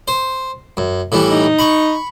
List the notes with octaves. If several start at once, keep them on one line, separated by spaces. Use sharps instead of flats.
C5
F#2
A2 E3 G3
D#4
B5 C#6